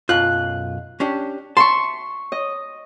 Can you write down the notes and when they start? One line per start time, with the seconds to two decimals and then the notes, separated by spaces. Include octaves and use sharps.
0.09 B1 F#2 F4 F#6
1.00 C#4 D4 G4
1.57 E5 A5 C6 C#6
2.32 D#5